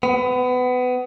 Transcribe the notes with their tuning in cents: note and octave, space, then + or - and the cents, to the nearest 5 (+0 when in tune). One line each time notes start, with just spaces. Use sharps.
B3 +25